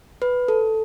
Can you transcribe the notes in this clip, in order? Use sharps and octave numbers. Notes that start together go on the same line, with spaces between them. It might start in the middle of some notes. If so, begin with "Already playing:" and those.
B4
A4